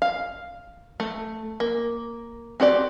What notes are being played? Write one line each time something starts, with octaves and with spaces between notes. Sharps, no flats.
F5
A3
A#3
C4 F#4 G4 D5